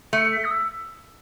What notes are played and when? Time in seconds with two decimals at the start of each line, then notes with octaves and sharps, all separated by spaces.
0.13 A3 C#7
0.32 B6
0.44 D#6
0.50 E6